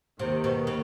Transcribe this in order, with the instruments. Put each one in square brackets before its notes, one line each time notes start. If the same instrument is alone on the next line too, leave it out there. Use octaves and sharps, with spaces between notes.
[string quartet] D#2 D#3 [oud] C3
[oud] B2
C#3